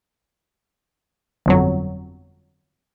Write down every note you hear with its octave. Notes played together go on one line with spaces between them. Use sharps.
G1 F2 F#3